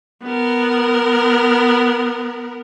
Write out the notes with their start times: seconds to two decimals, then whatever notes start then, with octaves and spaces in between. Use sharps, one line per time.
0.23 B3 A#4